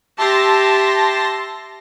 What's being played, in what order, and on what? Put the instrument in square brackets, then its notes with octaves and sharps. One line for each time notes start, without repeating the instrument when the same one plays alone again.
[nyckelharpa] G4 E5 [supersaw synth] A5 C6 A#6